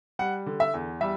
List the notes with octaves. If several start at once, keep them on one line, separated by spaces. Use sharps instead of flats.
G3 F#5
D3
E5
E2
G3 E5